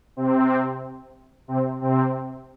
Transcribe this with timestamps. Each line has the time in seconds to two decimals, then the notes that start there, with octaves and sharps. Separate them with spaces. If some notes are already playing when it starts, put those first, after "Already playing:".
0.17 C3 C4
1.48 C3 C4
1.81 C3 C4